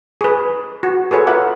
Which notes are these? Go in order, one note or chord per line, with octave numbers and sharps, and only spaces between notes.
G#4 B4
F#4
G#4 A4 B4 C#5
F4 A#4 B4 E5 F#5 D6